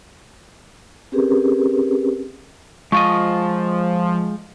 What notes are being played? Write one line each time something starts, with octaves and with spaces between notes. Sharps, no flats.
C4 C#4 G4 G#4 A#4 B4
F3 G#3 F4 D#5 C#6